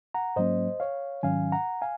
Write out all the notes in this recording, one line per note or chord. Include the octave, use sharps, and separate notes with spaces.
F#5 A#5
G#2 F#3 A#3 C#4 C5 D#5
C#5 F5
G#2 D#3 F#3 C#4 F5 G#5
F#5 A#5
F5 G#5